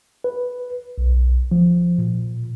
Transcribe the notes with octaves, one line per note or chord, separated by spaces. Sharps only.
B4
B1
F3
A#2